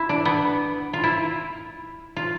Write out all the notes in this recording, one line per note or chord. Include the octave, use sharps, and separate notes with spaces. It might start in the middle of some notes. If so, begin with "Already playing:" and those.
Already playing: E4
D4
B3
F4
E4
F4